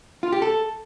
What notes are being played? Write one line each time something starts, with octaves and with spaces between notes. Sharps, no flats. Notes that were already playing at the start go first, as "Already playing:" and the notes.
F4
G4
A4